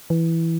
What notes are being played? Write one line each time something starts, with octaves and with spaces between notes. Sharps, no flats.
E3